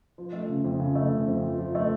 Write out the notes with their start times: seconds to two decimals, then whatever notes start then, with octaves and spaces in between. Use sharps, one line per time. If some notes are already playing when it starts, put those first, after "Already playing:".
0.18 F3
0.33 A3
0.49 C#3
0.65 F2
0.80 C#3
0.95 A3
1.12 C#3
1.28 F2
1.44 F3
1.58 F3
1.75 A3